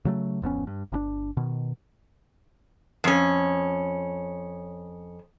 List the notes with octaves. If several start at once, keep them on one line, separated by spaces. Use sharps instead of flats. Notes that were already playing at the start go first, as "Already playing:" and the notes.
C#3 F#3 A3
D1 F2 B3 C#4
G2
G1 C#3 D4
B2 D#3
F2 C#4